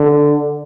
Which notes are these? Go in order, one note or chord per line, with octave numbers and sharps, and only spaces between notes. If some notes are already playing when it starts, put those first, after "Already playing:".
Already playing: D3